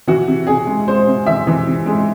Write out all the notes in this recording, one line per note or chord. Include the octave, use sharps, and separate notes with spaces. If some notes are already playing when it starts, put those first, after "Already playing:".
E3 F#4
C3
C3 G#4
G#3
G#3 C5
C3
E3 E5
E3
C3
G#3